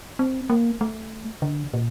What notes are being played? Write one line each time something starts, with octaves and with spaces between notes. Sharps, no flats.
C4
A#3
A3
D3
A#2